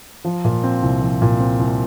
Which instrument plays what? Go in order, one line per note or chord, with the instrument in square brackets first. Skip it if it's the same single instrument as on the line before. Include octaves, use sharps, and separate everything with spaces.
[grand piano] F3
A#2
C4
C2
F3
A#2
C4
C2